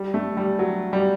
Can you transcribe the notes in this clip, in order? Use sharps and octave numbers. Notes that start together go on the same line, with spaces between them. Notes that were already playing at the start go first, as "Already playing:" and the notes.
Already playing: G3
A3
G3
F#3
G3